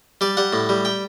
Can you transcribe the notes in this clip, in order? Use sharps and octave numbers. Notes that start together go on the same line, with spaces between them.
G3 D5
G3 F#5
A2
G3
G5